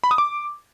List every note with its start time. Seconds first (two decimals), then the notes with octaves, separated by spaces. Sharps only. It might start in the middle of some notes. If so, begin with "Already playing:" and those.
0.04 B5
0.11 D#6
0.18 D6